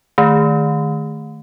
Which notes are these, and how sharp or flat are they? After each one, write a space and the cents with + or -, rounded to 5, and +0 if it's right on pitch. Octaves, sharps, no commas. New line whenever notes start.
D#3 -10 A3 +0